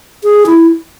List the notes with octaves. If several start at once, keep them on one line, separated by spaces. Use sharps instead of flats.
G#4
E4